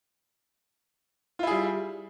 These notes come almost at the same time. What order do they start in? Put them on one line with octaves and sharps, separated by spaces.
F4 E4 G#4 G3